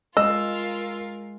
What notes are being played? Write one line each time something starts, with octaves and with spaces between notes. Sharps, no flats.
G#3 F4 A#4 D#5 E6